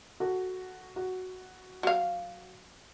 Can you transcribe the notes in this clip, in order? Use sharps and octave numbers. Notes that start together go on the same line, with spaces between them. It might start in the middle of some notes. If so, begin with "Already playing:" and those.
F#4 A4
F#4
F#3 F5